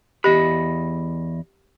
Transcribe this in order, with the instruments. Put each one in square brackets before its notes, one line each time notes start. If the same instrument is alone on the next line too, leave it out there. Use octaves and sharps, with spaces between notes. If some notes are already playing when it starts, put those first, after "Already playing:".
[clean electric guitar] E2 D#5 B5 [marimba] G4